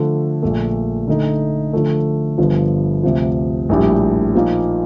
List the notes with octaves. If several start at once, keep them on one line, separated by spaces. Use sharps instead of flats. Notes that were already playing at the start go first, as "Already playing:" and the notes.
Already playing: D3 F3 A3
A#1 A#2 A3
D3 A3 D#4
D3 F3 A3
G1 G2 D3 F3
D2 C3 F3
A#1 A2 G3 D4 G4
A#2 F3 A#3 D#4